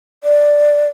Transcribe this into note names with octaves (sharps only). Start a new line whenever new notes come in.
D5